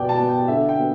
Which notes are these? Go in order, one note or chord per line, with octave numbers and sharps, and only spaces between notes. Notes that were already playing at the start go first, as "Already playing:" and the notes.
Already playing: B2 B3 D5 G5
A5
B3
G5
D3 E5
G5
B3